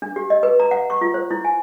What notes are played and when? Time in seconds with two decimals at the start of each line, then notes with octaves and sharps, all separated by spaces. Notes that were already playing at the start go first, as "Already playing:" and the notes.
0.02 D4
0.16 G4
0.30 D#5
0.43 B4
0.60 A#5
0.71 F#5
0.90 C#6
1.01 F4
1.14 C5
1.31 E4
1.44 G#5